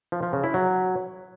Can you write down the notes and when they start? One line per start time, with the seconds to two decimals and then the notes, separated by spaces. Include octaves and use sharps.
0.12 F3
0.23 F3
0.33 C#3
0.44 E4
0.54 F#3